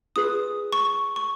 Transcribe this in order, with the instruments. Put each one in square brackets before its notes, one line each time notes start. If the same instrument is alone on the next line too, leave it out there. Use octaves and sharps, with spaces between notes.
[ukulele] F4 G#4 B4 [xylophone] D#6
[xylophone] C#6
C#6